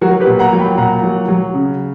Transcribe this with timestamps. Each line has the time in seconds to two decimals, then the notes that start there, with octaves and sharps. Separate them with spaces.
0.01 F#3 F#4 A#4
0.20 G4 B4
0.27 A#2
0.39 F#5 A#5
0.53 F#3
0.58 G5 B5
0.78 A#2 F#5 A#5
1.03 F#3
1.28 F#3
1.54 C#3